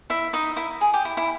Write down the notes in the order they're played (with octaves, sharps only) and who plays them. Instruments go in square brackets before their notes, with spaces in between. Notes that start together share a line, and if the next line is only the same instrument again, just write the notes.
[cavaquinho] E4 E5
D#4 D#5
E4 E5
G#4
G4
E4
E4